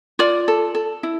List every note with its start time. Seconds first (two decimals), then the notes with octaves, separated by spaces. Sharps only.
0.19 F4 D5
0.48 A4
0.75 A4
1.03 E4